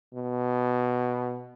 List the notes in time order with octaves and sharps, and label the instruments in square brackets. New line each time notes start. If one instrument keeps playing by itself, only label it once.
[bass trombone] B2